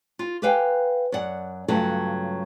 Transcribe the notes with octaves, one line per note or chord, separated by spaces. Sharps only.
F4
G4 A4 B4 F5 G5 G#5
F#2 D5 F#5
G2 C#3 F#3 A3 F4 A4